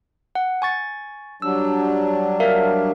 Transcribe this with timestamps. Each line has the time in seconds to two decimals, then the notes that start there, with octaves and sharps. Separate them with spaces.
0.35 F#5
0.62 G#5 C#6 A6
1.42 F#3 G3 D4 E6
2.40 A#4 E5 F5